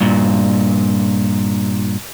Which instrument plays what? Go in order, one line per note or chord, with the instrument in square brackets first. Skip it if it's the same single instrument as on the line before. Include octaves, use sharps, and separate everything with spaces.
[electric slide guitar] G2 A#2